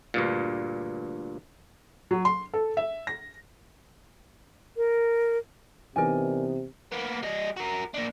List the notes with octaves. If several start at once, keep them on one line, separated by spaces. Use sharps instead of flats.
D2 G2 A#2
F#3
C6
A4
E5
A#6
A#4
C3 E3 B3 D#4 A#4 D5 G#5
A#3 B3
G3 D#5
F#4 A#4
A#3 D4